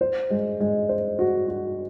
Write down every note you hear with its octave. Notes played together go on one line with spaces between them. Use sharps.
C5
G#3
G#3
C5
F#4
F#4